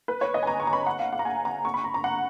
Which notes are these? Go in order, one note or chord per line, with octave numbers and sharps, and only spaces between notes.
B4
C#5
D#5
G#5
A#5
C#6
A#5
B5
F#5
F5
F#5
A#5
G#5
A#5
C#6
B5
A#5
A#5
F#5